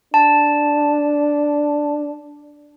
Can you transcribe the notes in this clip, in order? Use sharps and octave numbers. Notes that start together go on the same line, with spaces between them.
D4 A5